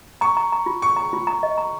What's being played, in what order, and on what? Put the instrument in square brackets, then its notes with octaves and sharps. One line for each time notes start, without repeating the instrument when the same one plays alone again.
[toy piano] A#5 [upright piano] C#6
[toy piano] A#5
A#5
F4
[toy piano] F4 [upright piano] C#6
[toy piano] A#5
F4
A#5
D#5
A#5